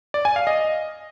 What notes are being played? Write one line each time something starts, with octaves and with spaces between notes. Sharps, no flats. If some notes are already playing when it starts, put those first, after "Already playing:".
D5
G#5
F5
D#5